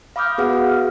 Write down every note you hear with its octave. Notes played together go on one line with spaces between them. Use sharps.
F5 B5 D6 D#6 F6 G6
B3 F#4 G#4 B4 F5 F#5
F#4
F6